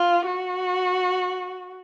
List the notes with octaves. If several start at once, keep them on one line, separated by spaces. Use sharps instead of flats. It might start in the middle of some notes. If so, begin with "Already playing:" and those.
Already playing: F4
F#4